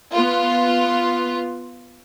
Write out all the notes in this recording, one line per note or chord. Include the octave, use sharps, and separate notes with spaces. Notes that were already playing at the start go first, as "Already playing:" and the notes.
B3 F4